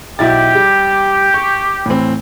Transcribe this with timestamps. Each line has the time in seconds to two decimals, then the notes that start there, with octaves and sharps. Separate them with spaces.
0.19 B1 E4 G4 A6
0.55 G3
1.34 C#6
1.86 A2 E3 C4